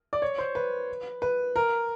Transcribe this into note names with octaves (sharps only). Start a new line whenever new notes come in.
D5
C#5
C5
B4
B4
A#4